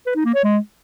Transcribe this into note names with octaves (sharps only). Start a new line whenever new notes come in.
B4
D#4
A#3
C#5
G#3